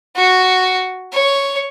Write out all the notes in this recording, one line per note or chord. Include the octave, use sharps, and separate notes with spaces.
F#4
C#5